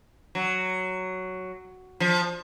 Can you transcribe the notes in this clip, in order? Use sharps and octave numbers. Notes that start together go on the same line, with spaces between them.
F#3
F3